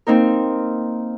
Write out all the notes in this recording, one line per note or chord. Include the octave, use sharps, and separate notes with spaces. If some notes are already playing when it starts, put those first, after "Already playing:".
A#3 C4 D#4 A#4